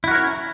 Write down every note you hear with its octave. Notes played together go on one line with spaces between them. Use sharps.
C#4 E4 F#4 A#4 C#5